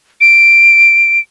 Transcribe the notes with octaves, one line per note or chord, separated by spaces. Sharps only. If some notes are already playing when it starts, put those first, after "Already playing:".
D7